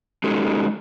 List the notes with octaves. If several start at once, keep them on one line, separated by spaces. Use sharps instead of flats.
G#3 C#4 D#4 F#4 G4 A4